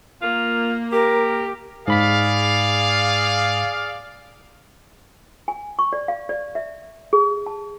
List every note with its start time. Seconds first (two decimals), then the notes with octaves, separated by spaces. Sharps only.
0.22 A#3 F4
0.92 G4 A#4
1.88 G#2 G#4 D5 F5 B5 B6
5.48 G#5
5.79 C#6
5.93 D5
6.08 F5
6.29 D5
6.55 E5
7.13 G#4
7.46 A5